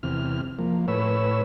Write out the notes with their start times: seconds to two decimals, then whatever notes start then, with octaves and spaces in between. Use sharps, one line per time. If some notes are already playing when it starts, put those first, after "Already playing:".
0.03 E2 C3 F6
0.59 F3 A#3
0.88 A2 B4 C#5 E6